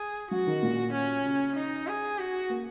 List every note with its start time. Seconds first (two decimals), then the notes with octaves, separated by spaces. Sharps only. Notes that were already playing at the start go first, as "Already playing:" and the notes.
Already playing: G#4
0.31 F#3 F#4
0.47 D#3
0.63 A#2
0.93 C#4
1.25 C#3
1.56 D#4
1.87 G#4
2.18 F#4
2.50 A#3